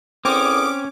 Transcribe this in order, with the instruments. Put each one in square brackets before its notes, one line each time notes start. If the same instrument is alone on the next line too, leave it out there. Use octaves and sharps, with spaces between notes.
[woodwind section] E2 D3 D#6 [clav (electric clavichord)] C4 [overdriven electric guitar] C#4 [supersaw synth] D6